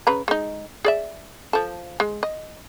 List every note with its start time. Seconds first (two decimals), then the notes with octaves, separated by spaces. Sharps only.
0.07 C#3 B4 A#5
0.28 G#3 D#4
0.85 G#4 D5 E5
1.53 F3 A4
2.00 G#3
2.23 D#5